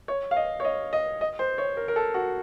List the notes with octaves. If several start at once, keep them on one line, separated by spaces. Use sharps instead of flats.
C#5
F5
D#5
C#5
D#5
D#5
D#5
C5
C#5
A#4
A#4
A4
F#4